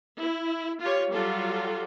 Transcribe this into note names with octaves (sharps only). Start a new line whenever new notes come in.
E4
F4 G4 C#5
F#3 G3 F4 G4 A4